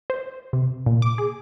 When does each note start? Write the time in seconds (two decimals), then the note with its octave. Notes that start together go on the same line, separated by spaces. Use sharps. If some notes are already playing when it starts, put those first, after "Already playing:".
0.10 C5
0.53 C3
0.86 A#2
1.02 D6
1.18 G#4